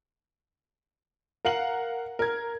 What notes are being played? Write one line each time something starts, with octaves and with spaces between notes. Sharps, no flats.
A#4 F5 F#5 F#7
A#4 G#6